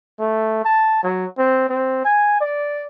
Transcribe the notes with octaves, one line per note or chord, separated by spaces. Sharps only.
A3
A5
F#3
C4
C4
G#5
D5